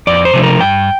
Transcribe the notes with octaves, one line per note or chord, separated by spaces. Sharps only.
F2 D5
C5
C3 F3 A3 D4
A#4
G2 G5